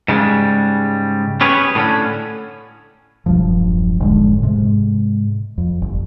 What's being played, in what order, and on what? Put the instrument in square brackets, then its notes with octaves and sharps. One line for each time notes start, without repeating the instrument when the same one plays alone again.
[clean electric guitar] G#2 C#3 G3 G#3
C#4 G4 G#4 B4 C#5
A2 D3 C#4
[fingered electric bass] E1 B1 G2 F3
F1 G#2 D3 G#3
G#2 C3 G#3
F2
G1